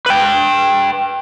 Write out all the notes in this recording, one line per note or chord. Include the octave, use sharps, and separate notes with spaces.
B4 G5